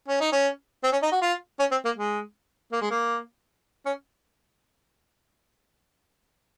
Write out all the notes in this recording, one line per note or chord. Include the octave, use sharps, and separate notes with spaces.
C#4
D#4
C#4
C4
C#4
D#4
F#4
F4
C#4
C4
A#3
G#3
A#3
G#3
A#3
C#4